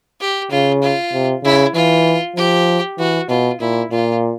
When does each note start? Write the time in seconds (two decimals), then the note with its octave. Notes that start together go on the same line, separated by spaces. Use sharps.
0.21 G4
0.51 C#3 F4
0.82 F4
1.13 C3
1.44 C#3 E4
1.75 E3 F4
2.36 F3 G4
2.98 E3 F#4
3.29 B2 F4
3.60 A#2 E4
3.91 A#2 F4